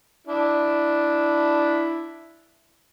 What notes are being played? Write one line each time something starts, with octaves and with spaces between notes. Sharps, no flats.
D4 E4